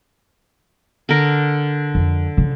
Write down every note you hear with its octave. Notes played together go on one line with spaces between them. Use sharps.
D3 A#4
F2
C#3 F3